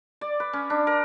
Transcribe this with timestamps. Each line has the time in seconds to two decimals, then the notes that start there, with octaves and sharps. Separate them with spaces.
0.21 D5
0.40 B4
0.53 C#4
0.70 D4
0.87 A#4